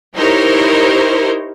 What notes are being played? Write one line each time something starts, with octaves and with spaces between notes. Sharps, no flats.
D#4 E4 G4 A#4 C5 C#5